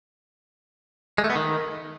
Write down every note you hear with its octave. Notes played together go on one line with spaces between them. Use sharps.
G#3
A3
B3
D#3